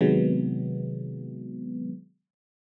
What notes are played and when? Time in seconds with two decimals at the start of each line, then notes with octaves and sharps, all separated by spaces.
0.01 C3 D#3 F#3 G#3 B3